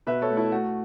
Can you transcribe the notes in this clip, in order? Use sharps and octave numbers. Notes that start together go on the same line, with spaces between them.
B2 B4 E5
A4 C#5
A3
E4 A4
A3 F#4